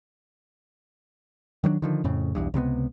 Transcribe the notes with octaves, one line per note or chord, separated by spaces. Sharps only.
D#3 F#3 G3 D4
D3 D#3 F3
F2 A2 C#3
B1 E2 G2
C#2 C3 D#3 B3